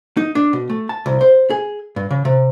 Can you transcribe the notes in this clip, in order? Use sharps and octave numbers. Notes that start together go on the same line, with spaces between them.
D#4
D4
B2
A3
A5
C2
C5
G#4
G2
C#3
C3